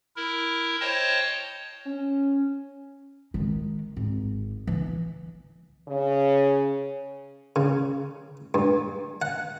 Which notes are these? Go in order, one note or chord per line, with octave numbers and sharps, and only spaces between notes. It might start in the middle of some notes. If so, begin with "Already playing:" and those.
E4 A#4
C5 C#5 D#5 G5 A5
C#4
D#3 G#3
G#1
E3 D4
C#3
C#3
G2
F#5